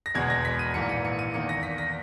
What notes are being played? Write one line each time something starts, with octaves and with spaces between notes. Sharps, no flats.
A#6
E1 E2 B2 G#3 B3 G#6
A#6
B6
D#7
A#1 G#2 E3 A#3 C#7
D#7
C#7
D#7
E2 D#3 A#3 C#7
A#6
B6
A#6